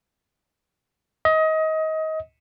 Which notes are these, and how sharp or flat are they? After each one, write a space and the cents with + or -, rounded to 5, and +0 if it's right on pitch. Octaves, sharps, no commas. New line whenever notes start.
D#5 +25